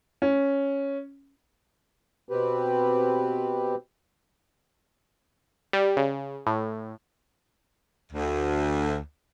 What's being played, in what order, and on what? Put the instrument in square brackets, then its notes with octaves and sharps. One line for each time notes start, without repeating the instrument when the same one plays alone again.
[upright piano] C#4
[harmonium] B2 C4 G4 B4
[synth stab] G3
C#3
A2
[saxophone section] D2